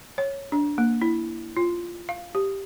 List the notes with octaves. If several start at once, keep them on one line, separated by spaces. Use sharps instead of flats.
C#5
D4
A#3
E4
F4
F5
G4